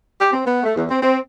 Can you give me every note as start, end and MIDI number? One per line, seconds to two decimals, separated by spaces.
0.20 0.28 67
0.33 0.42 60
0.46 0.63 59
0.63 0.74 57
0.76 0.84 40
0.90 1.00 60
1.03 1.19 60